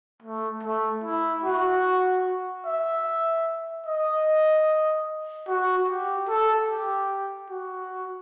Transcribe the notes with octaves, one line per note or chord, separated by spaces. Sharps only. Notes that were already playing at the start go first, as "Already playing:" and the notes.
A3
A3
E4
F#4
E5
D#5
F#4
G4
A4
G4
F#4